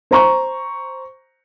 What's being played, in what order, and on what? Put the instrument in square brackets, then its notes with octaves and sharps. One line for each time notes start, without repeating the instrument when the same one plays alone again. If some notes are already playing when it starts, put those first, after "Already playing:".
[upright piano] C5 A#5 C#6